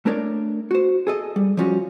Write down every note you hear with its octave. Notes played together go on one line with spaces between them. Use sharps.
A3 D4 A#4 C#5 D5
F#4 C5
G#4 A4 D#5
G3
F3 G3 C#4 F4 F#4